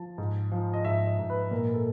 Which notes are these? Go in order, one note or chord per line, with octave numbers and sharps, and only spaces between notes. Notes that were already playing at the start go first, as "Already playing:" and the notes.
Already playing: F3 A5
G#2
F3
D#5
G#2 E5
D#5
G#2
B4
A#2 A#4
A4